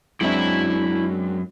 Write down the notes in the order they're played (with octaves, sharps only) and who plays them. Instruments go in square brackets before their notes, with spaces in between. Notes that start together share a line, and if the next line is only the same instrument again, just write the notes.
[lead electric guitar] F#2 [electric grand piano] G#3 C4 D4 [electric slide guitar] E4 E5